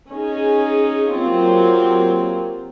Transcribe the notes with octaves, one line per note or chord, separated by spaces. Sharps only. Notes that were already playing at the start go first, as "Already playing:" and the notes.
C#4 D#4 G#4
F#3 A#3 C4 F4 G4